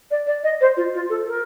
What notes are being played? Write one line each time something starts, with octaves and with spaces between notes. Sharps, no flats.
D5
D5
D#5
C5
F4
F4
A4
A#4